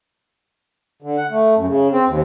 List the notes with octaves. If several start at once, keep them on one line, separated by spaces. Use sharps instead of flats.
D3
F#5
A3
F#2
C#3
C4
D#2